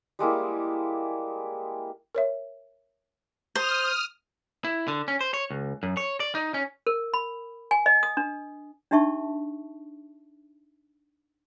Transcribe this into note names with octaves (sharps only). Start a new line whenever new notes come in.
G3 G#3 A#3 E4
A#4 C#5 E5
C5 D#6 F6
E4
D3
C#4
C5
C#5
C#2
F#2
C#5
D5
D#4
C#4
A#4
B5
G#5
D#5
D#6
D4
D4 D#4 G4 E5 A5 C#6